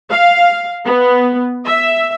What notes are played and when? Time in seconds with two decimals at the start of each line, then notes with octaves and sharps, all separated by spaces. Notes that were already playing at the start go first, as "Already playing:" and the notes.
0.10 F5
0.85 B3
1.65 E5